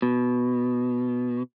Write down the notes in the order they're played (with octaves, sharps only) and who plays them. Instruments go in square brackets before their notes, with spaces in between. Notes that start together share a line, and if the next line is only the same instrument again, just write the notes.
[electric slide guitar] B2